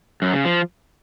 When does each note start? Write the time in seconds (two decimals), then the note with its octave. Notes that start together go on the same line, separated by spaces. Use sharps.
0.22 F#2
0.33 C#3
0.45 F3